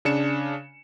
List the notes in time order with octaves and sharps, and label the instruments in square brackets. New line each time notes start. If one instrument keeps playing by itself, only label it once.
[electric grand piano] C#3 D4 C#7 E7